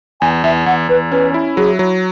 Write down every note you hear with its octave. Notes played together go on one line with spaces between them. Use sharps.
E2 G#5
E2 E5
E2 F#5
E2 B4
C#4 B4
E4
F#3 G#4
F#3